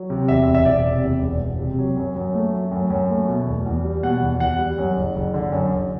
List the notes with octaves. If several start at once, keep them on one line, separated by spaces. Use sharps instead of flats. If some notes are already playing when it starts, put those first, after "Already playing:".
Already playing: F#3
C3
E2 E5
E1
E5
E1 D5
C3
E2
E1
E1
C3
F#3
F#2
F#2
A3
F#3
F#2
F#2
A3
B2
E2
E2
G3
B2 F#5
E2
E2 F#5
G3
F#2
F#1
F#1
D3
F#2
F#1